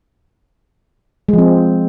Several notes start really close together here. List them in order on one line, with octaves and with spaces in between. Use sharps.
G#3 F3 C4